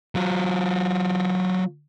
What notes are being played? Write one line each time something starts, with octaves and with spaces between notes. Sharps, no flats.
F#3 F4